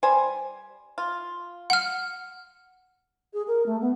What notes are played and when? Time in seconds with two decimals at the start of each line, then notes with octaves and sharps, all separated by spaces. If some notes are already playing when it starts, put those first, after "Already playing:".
0.03 G3 C5 G#5
0.98 F4
1.70 F#5 F6
3.34 G#4
3.48 A#4
3.66 A3
3.81 B3